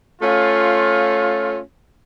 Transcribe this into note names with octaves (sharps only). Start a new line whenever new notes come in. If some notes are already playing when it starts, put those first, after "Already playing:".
A3 C#4 F4